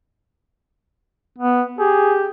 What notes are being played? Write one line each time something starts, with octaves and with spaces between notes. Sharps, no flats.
B3
G4 G#4